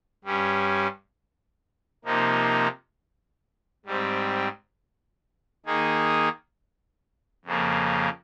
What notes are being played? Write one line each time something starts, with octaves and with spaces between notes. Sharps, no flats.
G2 G3 C#4
C3 F3 A#3 D#4
G#2 G3 C4
D#3 A#3 D#4 G#4
F2 C#3 F3 A#3